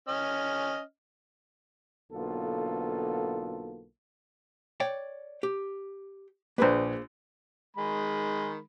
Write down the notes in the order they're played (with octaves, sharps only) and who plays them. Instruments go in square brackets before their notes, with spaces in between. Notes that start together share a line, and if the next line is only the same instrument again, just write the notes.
[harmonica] C#4 D#5 F6
[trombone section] B1 D3 A#3 B3 F4 A4
[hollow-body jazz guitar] C#5 D5 G5
G4
[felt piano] A#1 B4 [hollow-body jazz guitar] A#3 G#4 C5
[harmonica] D#3 G#3 B5